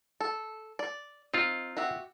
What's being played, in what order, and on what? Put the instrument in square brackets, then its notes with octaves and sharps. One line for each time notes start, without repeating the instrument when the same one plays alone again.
[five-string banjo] A4
D5
[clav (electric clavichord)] C4 F4 [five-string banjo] D#4
[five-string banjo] F#4 G4 E5